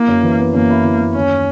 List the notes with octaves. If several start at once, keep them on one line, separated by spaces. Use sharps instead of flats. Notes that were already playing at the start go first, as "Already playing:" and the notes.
Already playing: A#3 E4
F#2
E3
B3
F#2 A#3
E4
E3
F#2
D#2 C#4